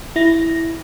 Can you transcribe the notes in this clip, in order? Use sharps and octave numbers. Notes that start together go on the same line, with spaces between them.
E4 A#6